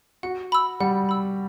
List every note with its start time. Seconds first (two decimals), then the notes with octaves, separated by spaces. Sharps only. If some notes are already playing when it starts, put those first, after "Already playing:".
0.23 F#4 F#5
0.52 B5 E6
0.80 G3 F#5
1.09 B5 E6